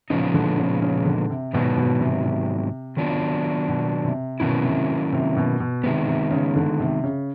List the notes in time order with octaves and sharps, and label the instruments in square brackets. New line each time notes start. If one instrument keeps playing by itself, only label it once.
[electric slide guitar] A#2 F3 G#3 B3 D#4 [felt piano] C#3
[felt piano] D3
C#3
C#3
D3
C3
[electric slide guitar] G#2 D#3 F#3 B3 [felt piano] B2
[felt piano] B2
C3
C3
[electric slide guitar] D#3 F#3 B3 D4 F4
[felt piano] B2
C3
[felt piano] B2 [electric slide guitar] D#3 F#3 A#3 C#4 E4
[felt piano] C3
C3
B2
B2
[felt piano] C3 [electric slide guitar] D#3 G#3 B3
[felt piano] C3
C#3
D3
C3
C#3